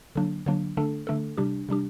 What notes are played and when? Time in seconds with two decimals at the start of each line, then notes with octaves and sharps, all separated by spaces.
0.15 D3 F#3 A#3 D4
0.46 D3 F#3 A#3 D4
0.77 D3 A3 D4 A4
1.07 D3 A3 D4 A4
1.37 C3 G3 D4 G4
1.69 C3 G3 D4 G4